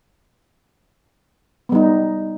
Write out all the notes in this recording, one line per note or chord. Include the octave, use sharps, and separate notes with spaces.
G3 B3 D#4